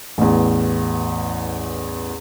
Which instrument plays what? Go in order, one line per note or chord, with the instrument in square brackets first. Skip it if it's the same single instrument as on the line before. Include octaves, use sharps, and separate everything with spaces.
[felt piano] A1 E2